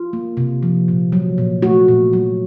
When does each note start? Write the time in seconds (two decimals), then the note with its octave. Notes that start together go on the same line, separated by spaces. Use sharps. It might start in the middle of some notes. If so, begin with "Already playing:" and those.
Already playing: F4
0.13 A#3
0.37 C3
0.63 F3
0.88 A#2
1.12 F#3
1.38 A#2
1.62 A3 F#4
1.88 A#2
2.13 F#3